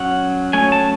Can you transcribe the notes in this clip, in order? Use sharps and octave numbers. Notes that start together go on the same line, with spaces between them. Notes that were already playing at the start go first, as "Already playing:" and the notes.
Already playing: F#3 C#4 F#5
F#3 A3 C#4 G#5
A5